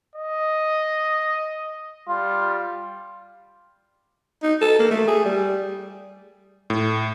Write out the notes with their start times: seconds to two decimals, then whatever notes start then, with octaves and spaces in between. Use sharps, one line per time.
0.15 D#5
2.09 G3 F4
4.43 D#4
4.61 A4
4.79 A#3
4.91 A3
5.07 G#4
5.25 G3
6.70 A2